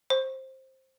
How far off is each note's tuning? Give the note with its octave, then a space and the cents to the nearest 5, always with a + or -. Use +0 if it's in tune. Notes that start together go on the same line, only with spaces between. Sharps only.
C5 +10